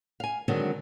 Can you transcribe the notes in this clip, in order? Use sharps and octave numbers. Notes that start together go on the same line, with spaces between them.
F5 G#5
D3 D#3 F#3 G#3 C4 D4